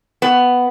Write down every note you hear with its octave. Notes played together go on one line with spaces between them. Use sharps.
B3